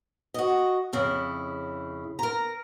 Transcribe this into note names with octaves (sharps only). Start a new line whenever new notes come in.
F#4 D#5
F2 C#3 E4
A#4 A#5